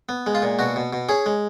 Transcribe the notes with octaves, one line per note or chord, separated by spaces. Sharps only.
B3
G#3
F4
A#2
B2 F#4
B2
B2
C#4 G#4
G#3